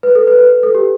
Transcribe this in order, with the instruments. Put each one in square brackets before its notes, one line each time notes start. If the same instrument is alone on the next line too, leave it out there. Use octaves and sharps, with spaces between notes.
[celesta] B4
A4
B4
B4
A4
G4